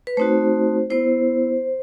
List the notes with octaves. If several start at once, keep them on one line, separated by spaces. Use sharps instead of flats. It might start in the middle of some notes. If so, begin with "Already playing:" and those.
B4
A3 C4 D#4 F#4 C5
B3 E4 C5